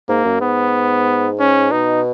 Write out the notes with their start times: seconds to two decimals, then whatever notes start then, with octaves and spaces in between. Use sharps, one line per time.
0.09 G#2 A#3
0.25 F#2
0.41 G#2 B3
1.40 C#4
1.72 B2 D#4